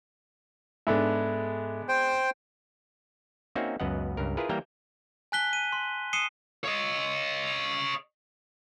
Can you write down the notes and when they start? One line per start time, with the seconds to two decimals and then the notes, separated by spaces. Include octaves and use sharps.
0.87 G#2 G#3 B3 D4 A4 E5
1.89 C5 G5
3.56 A#3 C4 C#4 D#4 F#4 E5
3.80 C#2 F#2 B3 D#5 F#5
4.17 C#2 G2 A#4
4.37 E4 F4 G#4 A#4 B4
4.49 E3 G3 A#3 E5 G5 A#5
5.32 G#5 A5 F#6 B6 G7
5.53 D#7
5.72 C6
6.13 D#6 C7 C#7 D#7 E7 G7
6.64 C#5 D#5